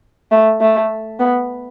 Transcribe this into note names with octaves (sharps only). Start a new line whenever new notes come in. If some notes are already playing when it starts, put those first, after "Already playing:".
A3
A3
B3